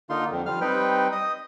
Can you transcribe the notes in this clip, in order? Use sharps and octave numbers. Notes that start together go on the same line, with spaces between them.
D3 A#3 D#4 F4 C6
F2 D3
F3 G3 F5 F6
G3 C4 D#4 B4 G5
D#5 D#6